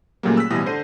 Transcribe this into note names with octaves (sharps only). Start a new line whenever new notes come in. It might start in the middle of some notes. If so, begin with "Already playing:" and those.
A#2 C#3 F#3 G3 A3 A#3
E6 F#6 B6
A1 B2 E3 G3 D#6 A#6
D3 C5 C7 D#7